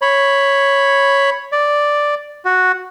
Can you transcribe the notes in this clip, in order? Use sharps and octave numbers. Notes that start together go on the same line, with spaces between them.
C#5 B5
D5
F#4